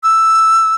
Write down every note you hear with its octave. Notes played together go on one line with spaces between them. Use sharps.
E6